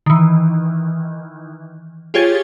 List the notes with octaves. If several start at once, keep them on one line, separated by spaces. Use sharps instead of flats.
D#3 E3
F4 G4 G#4 C#5 G#6 A6